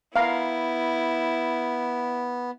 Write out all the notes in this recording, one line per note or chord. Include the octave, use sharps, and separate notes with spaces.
B3 E4 F5 A#5